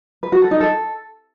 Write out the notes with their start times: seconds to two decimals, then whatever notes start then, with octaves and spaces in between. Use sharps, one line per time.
0.23 B4
0.32 F#4
0.42 A4
0.51 D#4
0.60 A4